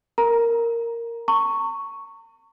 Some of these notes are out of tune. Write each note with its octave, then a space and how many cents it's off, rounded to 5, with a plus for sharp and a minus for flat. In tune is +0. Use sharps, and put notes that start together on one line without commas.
A#4 -5 A#5 +15
A#5 -40 C#6 +0